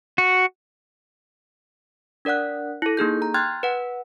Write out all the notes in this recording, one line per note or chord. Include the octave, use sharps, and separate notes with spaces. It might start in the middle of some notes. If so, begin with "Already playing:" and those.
F#4
D4 A#4 D5 F#5 F#6
E4 A4
A#3 D#4 G#4 G6
A#5
G5 C6 F6 F#6 G#6 A6
B4 F#5